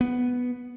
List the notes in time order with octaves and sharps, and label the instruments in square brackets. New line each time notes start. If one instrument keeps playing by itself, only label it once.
[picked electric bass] B3